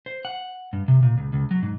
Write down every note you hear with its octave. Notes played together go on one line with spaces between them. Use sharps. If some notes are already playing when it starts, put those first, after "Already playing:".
C5
F#5
G2
C3
A#2
C#2
C#2
F#3
G#2